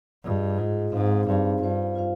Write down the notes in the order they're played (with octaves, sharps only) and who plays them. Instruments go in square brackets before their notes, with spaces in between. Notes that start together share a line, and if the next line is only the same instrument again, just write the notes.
[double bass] G2 [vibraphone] F4 G#4 D#5
[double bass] G#2 [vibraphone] F4 G#4 D#5
[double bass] G#2 [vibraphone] C4 D#4 G#4 C5 F5
[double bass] G2 [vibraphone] C4 D#4 G#4 C5 F5
[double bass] G2 [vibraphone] F4 C5 F5
[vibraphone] F4 C5 F5